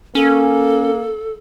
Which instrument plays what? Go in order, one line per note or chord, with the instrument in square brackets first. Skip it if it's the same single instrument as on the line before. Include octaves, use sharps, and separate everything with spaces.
[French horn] A#3 [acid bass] C#4 [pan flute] A4